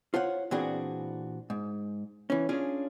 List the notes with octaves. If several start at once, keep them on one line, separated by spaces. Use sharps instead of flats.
F4 C5 C#5 F#5
A#2 E3 C4 D4 F#4 G#4
G#2
E3 C#4
C#4 D4 F4 G#4